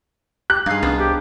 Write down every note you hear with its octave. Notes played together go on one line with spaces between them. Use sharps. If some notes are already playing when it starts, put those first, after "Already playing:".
G4 F#6
G2 D#4 G#4 F5
C2 B3 D4 F4
G4